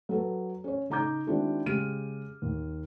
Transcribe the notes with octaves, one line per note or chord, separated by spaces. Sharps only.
F#3 A4 B4
C#4 C#5
C#3 D#4 A#5 D6 G6
D#3 G#3 C4 D4 E4 F#4
C#3 G#3 G4 F6 D#7
D#2